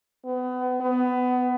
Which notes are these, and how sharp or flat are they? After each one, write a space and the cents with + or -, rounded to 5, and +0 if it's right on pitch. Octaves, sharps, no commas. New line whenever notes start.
B3 +30
B3 +20